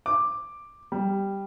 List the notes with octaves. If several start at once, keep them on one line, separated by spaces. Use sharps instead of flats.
D6
G3